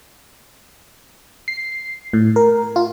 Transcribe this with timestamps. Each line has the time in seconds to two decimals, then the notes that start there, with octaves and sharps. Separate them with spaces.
1.48 C7
2.13 A2
2.36 A#4
2.76 F4